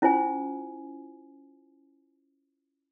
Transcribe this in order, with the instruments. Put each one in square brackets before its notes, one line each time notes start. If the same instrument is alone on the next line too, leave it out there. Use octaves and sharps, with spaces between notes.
[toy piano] C#4 E4 F4 C5 G#5